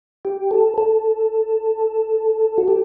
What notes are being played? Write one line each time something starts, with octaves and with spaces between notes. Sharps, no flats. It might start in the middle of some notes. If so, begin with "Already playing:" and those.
G4
A4
A4
F#4
G4